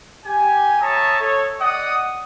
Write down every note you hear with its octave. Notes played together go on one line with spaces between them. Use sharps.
G4 G#5
C#5 E5 A5 A#5 C#6 D#6
A4 C#5
D5 D#5 F#5 D#6